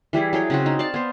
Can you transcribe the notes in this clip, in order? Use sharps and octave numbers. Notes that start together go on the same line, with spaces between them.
E3 G3 E4 G#4
F#3 G#4 C#5 G5
C#3 C4 F#4
D#4
D5 F5 A5
B3 C5